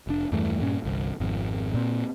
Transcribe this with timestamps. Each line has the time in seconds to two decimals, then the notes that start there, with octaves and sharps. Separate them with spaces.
0.07 F1 D4
0.32 E2 G2 E3 A3
0.60 G2 A#2 C#4
0.84 G1 C2
1.20 G#1 F2
1.74 A#2 C4